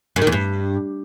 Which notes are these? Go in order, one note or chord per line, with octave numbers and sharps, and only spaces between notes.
F#2
D#3
E2
G2